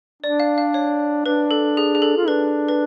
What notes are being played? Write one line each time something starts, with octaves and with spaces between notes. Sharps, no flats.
D4 D5
F5
F5
C#5
D4 B4
A4
G#4
G#4
A4
F4
D4 B4
B4